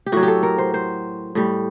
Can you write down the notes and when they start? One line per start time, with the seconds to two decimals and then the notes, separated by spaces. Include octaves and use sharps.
0.06 G4
0.12 A2 F#3 F#4
0.23 G4
0.28 A4
0.43 A#4
0.58 C5
0.74 C5
1.35 A2 G3